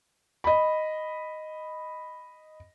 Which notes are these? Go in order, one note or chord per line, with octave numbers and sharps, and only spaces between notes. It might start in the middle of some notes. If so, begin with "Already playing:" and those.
D#5 B5